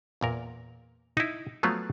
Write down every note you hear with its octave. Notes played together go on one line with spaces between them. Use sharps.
E2 A#2 A#4
D#4 E4
F3 F#3 A3 B3 F4